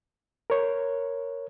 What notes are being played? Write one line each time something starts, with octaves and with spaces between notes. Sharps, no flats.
A#4 C#5